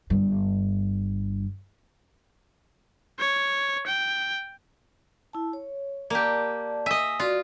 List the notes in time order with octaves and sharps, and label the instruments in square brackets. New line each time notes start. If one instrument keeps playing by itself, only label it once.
[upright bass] G1 G2
[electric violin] C#5
G5
[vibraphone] E4 A5
C#5
[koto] A#3 G4 [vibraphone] D5 A5
[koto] D#5 E5 [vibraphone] G#5
[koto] F4 [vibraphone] F#4 D5